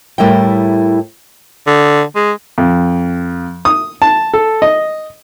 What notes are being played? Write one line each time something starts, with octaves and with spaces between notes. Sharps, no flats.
A2 G3 E4 A#4 E5 G5
D3
G#3
F2
D#6
A5
A4
D#5